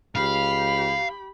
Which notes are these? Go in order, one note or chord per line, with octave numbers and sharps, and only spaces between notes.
C#2 G4 F5 B5